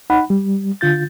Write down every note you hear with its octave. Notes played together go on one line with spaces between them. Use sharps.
D#4 F#5 B5
G3
D3 F4 G6 A6